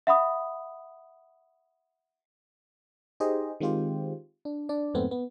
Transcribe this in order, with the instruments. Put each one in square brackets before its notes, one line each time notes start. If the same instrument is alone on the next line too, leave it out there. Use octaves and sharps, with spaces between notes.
[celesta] E5 F#5 B5 D#6
[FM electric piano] D#4 G4 G#4 C5 D#5
D#3 G#3 C4 F4 G4 C5
D4
D4 D5
F2 G#2 A3 B3 C4
B3